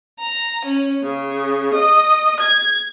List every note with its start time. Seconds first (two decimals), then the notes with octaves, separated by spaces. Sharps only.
0.18 A#5
0.64 C#4
1.02 C#3
1.74 D#5
2.39 G#6